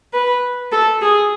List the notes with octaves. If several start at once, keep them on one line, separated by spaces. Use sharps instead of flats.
B4
A4
G#4